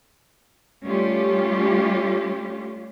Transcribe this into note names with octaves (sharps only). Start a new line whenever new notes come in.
G3 A3 C#4 F4 G4